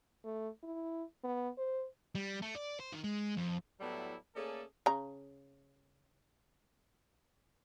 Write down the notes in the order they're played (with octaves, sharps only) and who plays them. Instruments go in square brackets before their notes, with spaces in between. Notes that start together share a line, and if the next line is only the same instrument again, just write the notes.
[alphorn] A3
E4
B3
C5
[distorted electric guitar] G3
A3
D5
C5
D#3
G#3
F2
[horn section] A2 F#3 G3 B3 E4 A4
A3 A#3 C#4 G#4 A4 D5
[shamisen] C#3 A#5